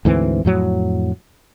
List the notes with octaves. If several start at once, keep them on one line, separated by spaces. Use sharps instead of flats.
D2 G#2 E3 C4
F2 A2 F#3